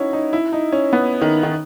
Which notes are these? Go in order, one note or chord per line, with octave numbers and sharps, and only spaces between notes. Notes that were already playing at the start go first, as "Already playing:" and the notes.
Already playing: C#4 D#4 E4 F#4
D#4
E4
D#4
C#4
B3
D#3
D#3